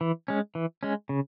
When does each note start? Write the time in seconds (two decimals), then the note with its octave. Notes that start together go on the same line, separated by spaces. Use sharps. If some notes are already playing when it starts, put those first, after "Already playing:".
0.01 E3
0.28 G#3 C#4
0.55 E3
0.83 G#3 C#4
1.09 C#3